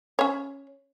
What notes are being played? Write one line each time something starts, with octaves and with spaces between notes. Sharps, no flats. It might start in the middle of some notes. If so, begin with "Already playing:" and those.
C#4 C#5